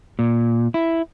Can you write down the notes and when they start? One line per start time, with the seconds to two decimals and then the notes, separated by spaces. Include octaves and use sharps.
0.19 A#2
0.74 E4